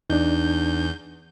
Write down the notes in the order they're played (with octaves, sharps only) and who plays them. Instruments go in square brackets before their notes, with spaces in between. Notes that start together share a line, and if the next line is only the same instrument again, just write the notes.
[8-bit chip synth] E2 G6 [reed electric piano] D4 D#4